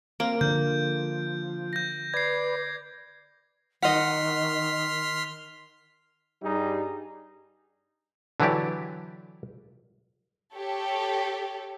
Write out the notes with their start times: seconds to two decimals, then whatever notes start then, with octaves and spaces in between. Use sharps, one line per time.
0.20 A#3 C4 A#4 F5 D7
0.41 D3 F3 G6
1.73 G6 A#6
2.14 B4 D5 G#6 C7
3.82 D#3 D#5 F#5 C6 F6 B6
6.43 G2 G3 D#4 G4 G#4
8.40 D3 E3 F#3 E4 G4 D5
10.54 G4 A4 C#5